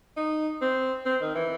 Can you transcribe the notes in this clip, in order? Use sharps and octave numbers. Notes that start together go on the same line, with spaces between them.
D#4
C4
C4
D#3
E3